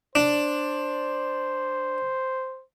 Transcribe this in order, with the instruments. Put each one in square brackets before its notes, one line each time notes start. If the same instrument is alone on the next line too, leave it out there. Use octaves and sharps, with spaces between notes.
[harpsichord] D4 [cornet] C5